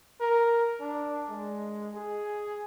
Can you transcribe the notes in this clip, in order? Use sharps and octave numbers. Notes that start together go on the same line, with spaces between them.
A#4
D4
G#3
G#4